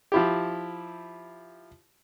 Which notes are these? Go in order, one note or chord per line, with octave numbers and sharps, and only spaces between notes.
F3 E4 G4